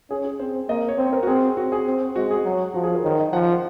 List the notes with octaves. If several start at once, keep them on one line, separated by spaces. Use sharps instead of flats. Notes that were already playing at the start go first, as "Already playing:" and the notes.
C#4 G#4
G#4
C4 C5
A#3 D#5
C#5
C4 C5
A#4
F#4
C4 G#4
F#4
G#4
C4
G#3 F#4
G#4
F#3
F3 F#4
G#4
A#4
D#3 C#5
D#5
F3 F#5